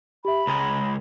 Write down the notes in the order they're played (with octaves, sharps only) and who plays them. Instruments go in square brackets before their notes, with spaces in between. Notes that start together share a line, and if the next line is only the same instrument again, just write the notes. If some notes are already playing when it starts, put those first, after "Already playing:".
[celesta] G4 E5 [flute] B5
[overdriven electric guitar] C#2 G#3 [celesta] A#5